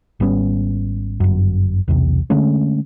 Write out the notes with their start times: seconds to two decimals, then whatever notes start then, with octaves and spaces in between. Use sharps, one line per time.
0.20 G#1 G3 B3 C#4
1.20 G1 F#2
1.88 B1 E2 C3
2.30 D3 G#3 A3 C#4